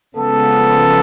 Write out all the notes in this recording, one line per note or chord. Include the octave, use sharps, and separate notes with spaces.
C#3 F3 G#3 B3 A4